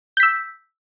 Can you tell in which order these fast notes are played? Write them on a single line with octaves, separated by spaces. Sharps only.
G6 B6 E6